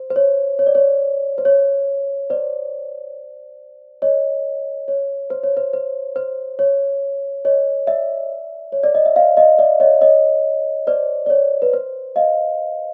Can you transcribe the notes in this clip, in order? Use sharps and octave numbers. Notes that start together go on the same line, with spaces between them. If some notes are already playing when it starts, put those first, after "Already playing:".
Already playing: C5
C5
C#5
C#5
D5
C#5
C5
C#5
C5 D5
C#5 D#5
C#5
C5
C#5
C5
C5
C5
C#5
C#5 D#5
D5 E5
C#5
D5
D#5
E5
D#5 F5
D#5 F5
D5 E5
C#5 D#5
C#5 D#5
C5 D5
D5
C#5
B4
C5
D#5 F5